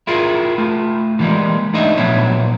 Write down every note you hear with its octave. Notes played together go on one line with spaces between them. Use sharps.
E4 F4 G#4 A#4
A3 F4
D3 E3 F3 G3 G#3 A#3
G3 A3 D4 D#4 D#5 E5
A#2 F3 F#3 B3 C#5 E5